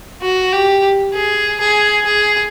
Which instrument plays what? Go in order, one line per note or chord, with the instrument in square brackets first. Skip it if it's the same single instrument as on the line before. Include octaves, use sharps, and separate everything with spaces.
[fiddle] F#4
G4
G#4
G#4
G#4